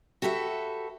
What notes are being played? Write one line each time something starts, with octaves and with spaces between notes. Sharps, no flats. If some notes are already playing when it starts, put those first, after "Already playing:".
F#4 G4 A4 B4 E5